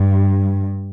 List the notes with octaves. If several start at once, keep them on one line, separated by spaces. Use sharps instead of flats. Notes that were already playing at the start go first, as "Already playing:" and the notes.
Already playing: G2